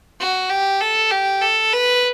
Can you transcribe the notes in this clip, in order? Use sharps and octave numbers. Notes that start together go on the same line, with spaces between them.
F#4
G4
A4
G4
A4
B4